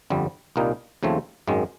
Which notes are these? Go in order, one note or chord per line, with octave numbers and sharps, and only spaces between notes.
G1 F2 D3 G3
C2 A#2 G3 A#3 D#4
D#2 C#3 F3 A3 C4
G#1 F#2 D#3 G#3